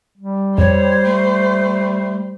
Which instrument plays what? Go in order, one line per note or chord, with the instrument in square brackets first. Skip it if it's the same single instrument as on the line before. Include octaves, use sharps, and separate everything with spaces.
[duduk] G3
[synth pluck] F2 [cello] C5 [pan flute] C#5
[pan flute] A3